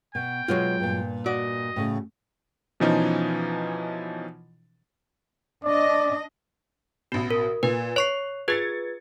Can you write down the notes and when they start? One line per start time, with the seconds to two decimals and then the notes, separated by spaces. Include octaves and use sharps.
0.15 B2 G5
0.48 B2 F#3 G#3 F4 C#5
0.80 G2 A#2
1.26 F#4 D5 D#5
1.76 A2 C#3
2.80 B2 E3 F3 C#4 D#4
5.64 D4 D5 D#5
7.12 A1 B2 F#4
7.31 A#4
7.63 A#2 B4
7.96 C#5 C#6 C7 F7
8.48 F4 G#4 B4 G#6 A6 C#7